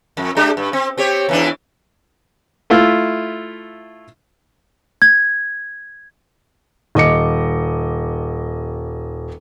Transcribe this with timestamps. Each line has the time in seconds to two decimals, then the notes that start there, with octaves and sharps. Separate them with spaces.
0.17 F2
0.37 G#3 D4 G4
0.57 G2
0.73 C4
0.98 C4 G4 C#5
1.29 E2 E3 D4
2.70 A3 E4 F4
5.02 G#6
6.95 D#1 D#5 D6 C#7